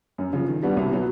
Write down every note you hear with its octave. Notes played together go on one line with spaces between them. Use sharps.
F#2
C#3 F3
D#3
G3 B3 D4 F#4
C2
B2 F#3 B3